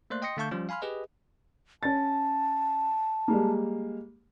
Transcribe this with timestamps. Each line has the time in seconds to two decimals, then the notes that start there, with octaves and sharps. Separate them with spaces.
0.10 A3 A#3 C5 D5 C6 F#6
0.22 D#5 G5 C6 D#6 A#6 C#7
0.37 D3 A3 F5 A5 C#6 G6
0.51 F3 G3 C#4 F4
0.69 F5 G#5 B5 C6 F6
0.82 G4 G#4 B4 D#5
1.83 C#4 A5 A6
3.28 G3 G#3 A#3